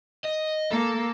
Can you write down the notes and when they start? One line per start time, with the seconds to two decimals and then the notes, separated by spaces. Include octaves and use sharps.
0.24 D#5
0.71 A#3 A4